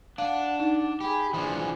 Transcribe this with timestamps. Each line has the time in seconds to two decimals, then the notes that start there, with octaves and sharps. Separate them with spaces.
0.18 D4 F5 F#5 A5
0.60 D#4
1.01 G4 G#4 B5
1.34 E3 F3 D4 G#4